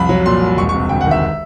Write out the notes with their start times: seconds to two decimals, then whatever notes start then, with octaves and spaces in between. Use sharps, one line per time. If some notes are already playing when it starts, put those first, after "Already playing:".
Already playing: C2 F2 B5
0.09 F#3
0.26 A#2 C6
0.41 C2
0.57 E1 C#6
0.69 C3 C#6
0.89 D2 G5
1.01 F#5
1.06 D#3
1.11 E5